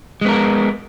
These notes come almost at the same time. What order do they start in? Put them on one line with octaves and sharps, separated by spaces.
G#3 B3 A#4